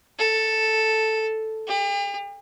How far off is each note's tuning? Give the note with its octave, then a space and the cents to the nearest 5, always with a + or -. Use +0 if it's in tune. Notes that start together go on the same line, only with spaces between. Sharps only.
A4 +0
G4 +45